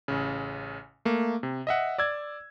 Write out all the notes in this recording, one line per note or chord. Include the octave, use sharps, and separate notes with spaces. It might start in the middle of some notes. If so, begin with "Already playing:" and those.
A1 C#3
A3 A#3
C3
D#5 E5 F#5
D5 E6 G#6